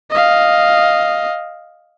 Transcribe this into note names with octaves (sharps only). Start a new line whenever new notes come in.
D#5 F5